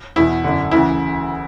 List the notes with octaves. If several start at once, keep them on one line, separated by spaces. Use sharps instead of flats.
E2 B2 E4
F#2 D3
D2 C#3 E3 E4